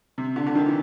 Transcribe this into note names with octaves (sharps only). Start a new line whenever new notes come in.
C3
D3
D3
D#3
E3